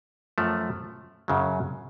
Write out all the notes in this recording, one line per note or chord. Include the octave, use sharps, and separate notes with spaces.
F#2 F3 A3
F#2 C#3 F#3